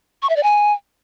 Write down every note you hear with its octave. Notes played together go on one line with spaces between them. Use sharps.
C#6
E5
D5
G#5